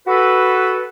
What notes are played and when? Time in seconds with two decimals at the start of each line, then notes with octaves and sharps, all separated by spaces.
0.07 F#4 A4 B4